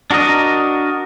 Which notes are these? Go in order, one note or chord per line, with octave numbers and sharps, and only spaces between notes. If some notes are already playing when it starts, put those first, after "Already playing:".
D4 F#4 A#4 D#5